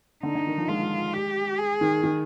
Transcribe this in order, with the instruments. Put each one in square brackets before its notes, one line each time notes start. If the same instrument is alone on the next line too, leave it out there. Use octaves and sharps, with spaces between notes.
[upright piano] D3 [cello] D#4
[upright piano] D3
D#3
F3
[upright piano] G#3 [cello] F4
[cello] G4
G#4
[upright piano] D#3
D#3